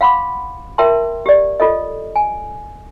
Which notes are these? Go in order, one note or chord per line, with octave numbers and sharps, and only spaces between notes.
F5 F#5 B5 C6 D6
F4 A#4 E5 G5 A5 C6
G4 D5
F4 A4 D#5
G#5